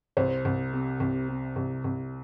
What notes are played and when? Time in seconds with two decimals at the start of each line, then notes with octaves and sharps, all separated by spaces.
0.17 C2 C5
0.45 C2
0.73 C3
1.00 C2
1.29 C3
1.56 C2
1.84 C2